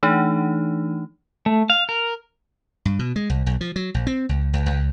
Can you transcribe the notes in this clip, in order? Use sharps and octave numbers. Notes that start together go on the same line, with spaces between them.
E3 A3 D4 D#4
A3
F5
A#4
G2
B2
G#3
C2
B1
F3
F#3
A#1
C4
C#2
C#2
C#2